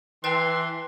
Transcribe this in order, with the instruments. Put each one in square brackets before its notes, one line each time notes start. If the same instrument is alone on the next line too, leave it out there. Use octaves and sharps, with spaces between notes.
[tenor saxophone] E3 [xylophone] B4 G5 A5 [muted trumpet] C6